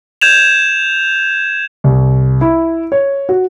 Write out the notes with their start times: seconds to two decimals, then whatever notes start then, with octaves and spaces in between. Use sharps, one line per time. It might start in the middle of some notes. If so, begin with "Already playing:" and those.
0.21 G6 G#6 E7 F7
1.84 C2
2.41 E4
2.92 C#5
3.29 F#4